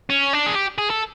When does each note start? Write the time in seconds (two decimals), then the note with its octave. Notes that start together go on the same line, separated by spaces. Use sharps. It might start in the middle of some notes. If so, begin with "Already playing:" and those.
0.10 C#4
0.33 D4
0.46 G#4
0.55 G4
0.78 G#4
0.90 A4